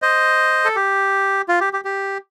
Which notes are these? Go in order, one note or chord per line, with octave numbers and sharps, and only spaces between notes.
C5 D#5
A4
G4
F4
G4
G4
G4